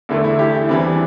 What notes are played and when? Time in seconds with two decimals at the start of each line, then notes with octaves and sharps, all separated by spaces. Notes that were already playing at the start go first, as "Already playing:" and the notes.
0.09 E2 D3 A3 E4
0.24 E4
0.39 E4 G4
0.54 E4
0.69 E2 E3 G3 C4 D4